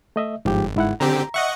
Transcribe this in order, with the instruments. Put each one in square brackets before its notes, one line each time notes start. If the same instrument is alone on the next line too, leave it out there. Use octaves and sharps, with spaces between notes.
[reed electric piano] A3 D#5 E5
[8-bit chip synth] G1 [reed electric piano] G#2 F3 G4
[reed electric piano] G#2 E4 F#5
[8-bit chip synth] D3 C4 G4 [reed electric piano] A#5
[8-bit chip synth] D#5 F#5 C#6 [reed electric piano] E5